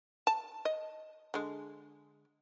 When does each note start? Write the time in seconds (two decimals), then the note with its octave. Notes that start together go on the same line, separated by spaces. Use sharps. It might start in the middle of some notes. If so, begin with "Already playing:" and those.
0.27 A5
0.65 D#5
1.34 D3 G#3